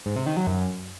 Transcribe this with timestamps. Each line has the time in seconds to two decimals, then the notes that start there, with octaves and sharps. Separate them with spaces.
0.06 G#2
0.16 C3
0.26 D#3
0.37 F#3
0.47 F#2